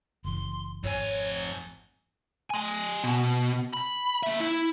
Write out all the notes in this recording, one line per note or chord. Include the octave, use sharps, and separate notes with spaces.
F#1 E3 C6
G#1 F2 C#5 G#5
G#5 C6
B2
B5
A#3 E5
E4